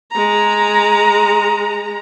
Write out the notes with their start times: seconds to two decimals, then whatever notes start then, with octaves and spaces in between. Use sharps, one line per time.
0.12 G#3 A#5